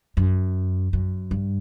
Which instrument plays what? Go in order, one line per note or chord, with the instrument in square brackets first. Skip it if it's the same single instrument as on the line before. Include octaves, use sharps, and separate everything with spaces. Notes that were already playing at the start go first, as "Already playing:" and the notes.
[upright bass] F#2
F#2
G2